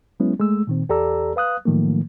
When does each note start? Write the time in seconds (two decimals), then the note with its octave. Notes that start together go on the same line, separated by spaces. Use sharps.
0.20 F#3 G#3 B3 C#4 E4
0.39 G#3 A3 E6
0.67 A#2 D#3 C4
0.89 E2 G4 A4 D5 A#5 E6
1.36 B4 F5 D#6 F#6
1.65 A2 D#3 F3 F#3 A3 A#3